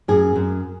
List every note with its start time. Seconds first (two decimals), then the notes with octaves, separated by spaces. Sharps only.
0.08 F#2 G#4
0.36 F#2